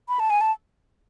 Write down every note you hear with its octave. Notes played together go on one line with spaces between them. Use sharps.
B5
A5
G#5
A5